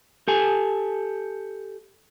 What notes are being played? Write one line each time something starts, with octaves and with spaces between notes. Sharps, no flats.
G4 A4 G#5